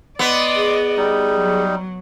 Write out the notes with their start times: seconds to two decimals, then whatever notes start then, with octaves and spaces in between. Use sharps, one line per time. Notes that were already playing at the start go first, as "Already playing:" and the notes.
0.19 B3 D5 D#5 C6 D6
0.56 G#4
0.97 G3 D#4
1.38 F#3